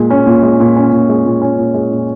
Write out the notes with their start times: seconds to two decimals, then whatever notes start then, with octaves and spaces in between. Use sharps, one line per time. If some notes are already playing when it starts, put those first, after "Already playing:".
Already playing: A#2 G#3
0.10 C#4
0.27 A#2
0.43 G#3
0.60 A#2
0.77 C#4
0.92 A#2
1.09 G#3
1.26 A#2
1.42 C#4
1.59 A#2
1.74 G#3
1.91 A#2